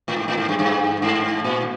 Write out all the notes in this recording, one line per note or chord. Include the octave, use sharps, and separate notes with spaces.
A2
G#2
A2
G#2
G2
G2
G#2
A#2